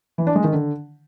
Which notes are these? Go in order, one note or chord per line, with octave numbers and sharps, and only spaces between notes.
E3
D4
G#3
D#3
D3